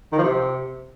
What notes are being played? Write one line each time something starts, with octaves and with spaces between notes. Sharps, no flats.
D#3
F3
C3